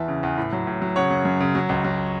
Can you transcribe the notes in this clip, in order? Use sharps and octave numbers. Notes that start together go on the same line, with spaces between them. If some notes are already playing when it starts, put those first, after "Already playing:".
Already playing: E2 E3 E5 A5
C#3
E2
A2
F#3
A2
F#3
C#3 C#5 F#5
F#2
F#2
C#3
F#3
C#2
F#3